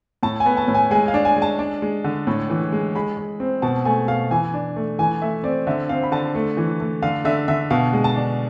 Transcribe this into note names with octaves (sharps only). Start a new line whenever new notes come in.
A2 A5
G#5
B3
A5
A2
G#5
G#3 G#5
F5
D4
G#5
G#3
A5
D4
G#3
D3
A2
E3
G#3
G#3 B5
G#3
C4
B2 A5
A3 G#5
B2 F5
E3 G#5
D4
A3
E3 G#5
A3 E5
C4 D5
D3 E5
C4 F5
B5
D3 A5
A3
E3
A3
D3 F5
D3 E5
D3 E5
B2 F5
G#3
A5
D4